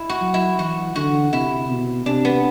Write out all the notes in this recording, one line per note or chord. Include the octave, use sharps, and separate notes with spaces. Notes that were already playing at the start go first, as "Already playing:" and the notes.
Already playing: E4
F#4
F#3
E4
E3 F#4
D3 F#4
C3 E4
B2
C3 D4
B3